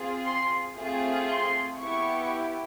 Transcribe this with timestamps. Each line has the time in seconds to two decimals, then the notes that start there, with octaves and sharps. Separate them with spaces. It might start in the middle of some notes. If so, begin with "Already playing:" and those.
Already playing: C4 F4 G#4
0.24 C6
0.76 A3 C4 F4 G#4
1.28 C6
1.79 B3 E4 G4 C#6